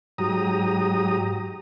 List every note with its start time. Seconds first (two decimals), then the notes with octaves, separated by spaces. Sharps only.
0.18 G#2 F#3 G4 A#5 D#6